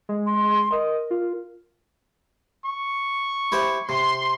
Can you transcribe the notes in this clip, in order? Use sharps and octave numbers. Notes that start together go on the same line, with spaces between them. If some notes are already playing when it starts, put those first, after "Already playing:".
G#3
C6
A#4 D#5
F4
C#6
E4 G4 C5
C3 C6